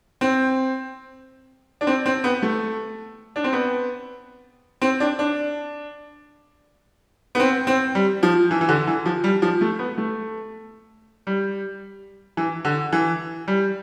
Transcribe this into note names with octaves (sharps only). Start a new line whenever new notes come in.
C4
D4
C4
C4
B3
A3
D4
C4
B3
C4
D4
D4
B3
C4
C4
G3
F3
E3
E3
D3
E3
F3
G3
F3
A3
B3
A3
G3
E3
D3
E3
G3